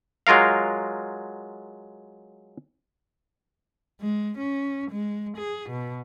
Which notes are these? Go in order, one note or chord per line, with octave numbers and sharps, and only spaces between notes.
F#3 G#3 F4 A#4 F5
G#3
C#4
G#3
G#4
B2